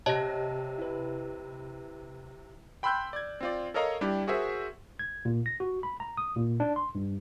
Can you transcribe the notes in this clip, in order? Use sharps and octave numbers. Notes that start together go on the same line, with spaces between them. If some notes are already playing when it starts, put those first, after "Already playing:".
C3 C#5 D#5 A5 A#6
E4 B4
G5 B5 C6 E6 F#6 G6
D5 G#6
C4 F4 D5
A4 A#4 C#5 D#5 F5 A#5
G3 D4 E4 G4
F#4 G#4 A#4 C5 E5
G#6
A#2
A#6
F#4
B5
A#5
D#6
A#2
D4
C6
G2